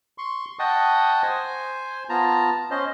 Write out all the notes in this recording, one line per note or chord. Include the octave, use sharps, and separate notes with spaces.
C6 C#6
D#5 F#5 G5 A5 C#6 D#6
C5 G#5
B3 F4 A5 A#5
C#4 C5 D#5